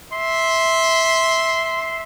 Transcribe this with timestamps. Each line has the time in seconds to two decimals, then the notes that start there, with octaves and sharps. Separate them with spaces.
0.13 E5 C6